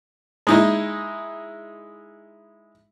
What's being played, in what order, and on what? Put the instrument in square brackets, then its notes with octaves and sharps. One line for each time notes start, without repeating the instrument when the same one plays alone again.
[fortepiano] G#3 D#4 E4